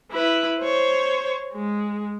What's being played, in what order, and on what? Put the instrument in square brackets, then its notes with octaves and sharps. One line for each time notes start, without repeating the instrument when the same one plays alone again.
[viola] E4 B4
C5 C#5
G#3